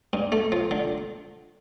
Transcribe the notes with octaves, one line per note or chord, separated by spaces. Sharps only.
G2
A3
F3
D3